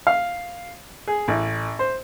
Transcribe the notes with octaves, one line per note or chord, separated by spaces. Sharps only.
F5
G#4
A1
C5